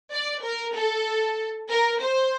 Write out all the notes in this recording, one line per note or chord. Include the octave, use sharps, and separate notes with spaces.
D5
A#4
A4
A#4
C5